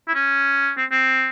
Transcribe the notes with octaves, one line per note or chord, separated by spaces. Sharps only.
E4
C#4
C4
C4